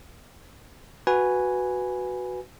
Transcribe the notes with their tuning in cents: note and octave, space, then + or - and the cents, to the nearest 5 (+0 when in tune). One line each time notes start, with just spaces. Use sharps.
F#4 +0 B4 +0 G#5 +0